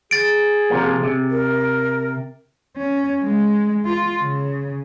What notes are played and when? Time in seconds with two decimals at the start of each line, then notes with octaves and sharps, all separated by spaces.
0.11 G#4 A6 D7
0.70 C3 F3 A#3
1.03 C3
1.31 A#4
2.77 C#4
3.22 G#3
3.85 F4
4.20 C#3